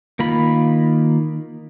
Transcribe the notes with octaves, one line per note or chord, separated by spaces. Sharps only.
D#3 A#3 F4 B5